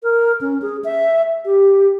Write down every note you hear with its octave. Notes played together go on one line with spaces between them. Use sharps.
A#4
C#4
G#4
E5
G4